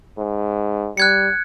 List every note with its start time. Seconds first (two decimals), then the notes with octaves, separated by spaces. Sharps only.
0.18 G#2
0.97 G3 F#6 G#6 C#7